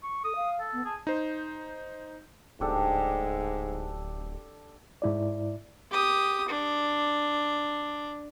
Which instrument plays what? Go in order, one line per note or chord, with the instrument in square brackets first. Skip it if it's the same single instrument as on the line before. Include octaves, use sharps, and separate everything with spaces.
[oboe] C#6
[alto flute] A4 [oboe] D#6
[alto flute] F5
[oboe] A4
[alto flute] B3
[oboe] G#4 [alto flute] A5
[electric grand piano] D#4 C5
[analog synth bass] D1 [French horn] G#2 [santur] D4 G4 A4
[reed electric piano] G#2 E4 D5
[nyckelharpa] G4 D#6
D4